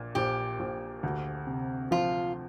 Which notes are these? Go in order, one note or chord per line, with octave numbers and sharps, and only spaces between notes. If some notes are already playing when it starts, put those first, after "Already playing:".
Already playing: A#1 A#2
A#1 G4
A#1
D2
C3
F3 F4